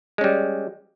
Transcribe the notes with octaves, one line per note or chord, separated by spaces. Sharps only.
G3 G#3 C#4